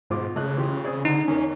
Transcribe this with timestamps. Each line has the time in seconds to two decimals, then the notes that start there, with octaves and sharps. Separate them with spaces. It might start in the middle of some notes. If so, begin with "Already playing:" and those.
0.10 G#2 B2 F4 D6
0.36 C#3 A3 D#5 F#6
0.57 E3 F4 G4
0.85 C4 G#4 D5
1.05 D3 D#4
1.28 E2 C#4 A#4